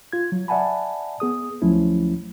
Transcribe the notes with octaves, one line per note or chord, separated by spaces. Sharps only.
F4 G#6
F#3
D5 E5 F#5 G#5 A5 B5
B3 G#4 D#6
D2 F3 F#3 A3 C#4 E4